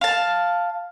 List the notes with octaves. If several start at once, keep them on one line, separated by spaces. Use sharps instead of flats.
F5 A5